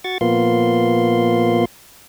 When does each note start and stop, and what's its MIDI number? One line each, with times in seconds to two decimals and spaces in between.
0.04 0.18 66
0.04 0.18 85
0.04 0.18 93
0.21 1.65 46
0.21 1.65 53
0.21 1.65 58
0.21 1.65 59
0.21 1.65 65
0.21 1.65 84